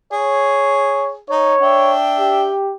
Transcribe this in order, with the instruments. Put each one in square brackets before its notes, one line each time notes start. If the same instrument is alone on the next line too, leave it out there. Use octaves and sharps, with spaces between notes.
[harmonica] G#4 [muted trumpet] C#5
[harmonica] D#4 [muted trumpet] C#5
[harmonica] D4 E5 G5
[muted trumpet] G4